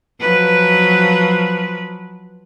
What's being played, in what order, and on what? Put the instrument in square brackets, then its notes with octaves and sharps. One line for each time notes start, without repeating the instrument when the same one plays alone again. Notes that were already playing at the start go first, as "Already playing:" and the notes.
[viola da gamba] F3 F#3 B4